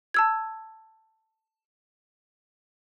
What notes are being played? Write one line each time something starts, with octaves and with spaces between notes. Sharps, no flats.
A5 E6 G#6